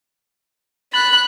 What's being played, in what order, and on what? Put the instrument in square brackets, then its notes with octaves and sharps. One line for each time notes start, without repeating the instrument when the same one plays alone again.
[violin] B5 F#6 [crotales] A6 F#7